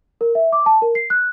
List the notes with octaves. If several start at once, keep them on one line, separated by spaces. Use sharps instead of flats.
A#4
E5
D6
A5
A#4
C7
F#6